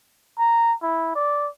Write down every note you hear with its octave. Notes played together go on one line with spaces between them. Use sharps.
A#5
E4
D5